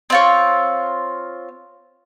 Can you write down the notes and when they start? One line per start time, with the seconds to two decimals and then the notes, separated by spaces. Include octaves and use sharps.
0.10 C4 F4 C#5